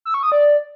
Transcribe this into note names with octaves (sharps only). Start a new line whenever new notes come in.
E6
C#6
D#6
D5